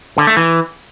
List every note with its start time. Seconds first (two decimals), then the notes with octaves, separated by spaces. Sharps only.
0.18 D3
0.27 A3
0.37 E3